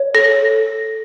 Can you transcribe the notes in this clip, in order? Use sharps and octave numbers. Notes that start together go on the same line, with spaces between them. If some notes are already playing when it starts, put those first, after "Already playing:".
Already playing: C#5
A4 A#6